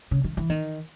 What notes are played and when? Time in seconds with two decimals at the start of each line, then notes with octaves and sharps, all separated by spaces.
0.11 C#3
0.24 D#3
0.37 E3
0.50 D#3